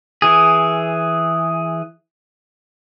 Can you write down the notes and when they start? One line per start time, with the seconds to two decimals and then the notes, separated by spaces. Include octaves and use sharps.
0.22 E3 G#4